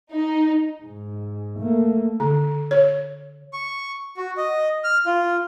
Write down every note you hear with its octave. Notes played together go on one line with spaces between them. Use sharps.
D#4
G#2
A3 A#3
D3
C#5
C#6
F#4
D#5
F6
F4